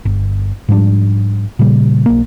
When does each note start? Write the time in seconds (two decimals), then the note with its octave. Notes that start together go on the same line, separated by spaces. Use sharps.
0.05 G1
0.69 G#2 F3 G3 D4
1.59 A#2 C#3 G3
2.06 B1 A#3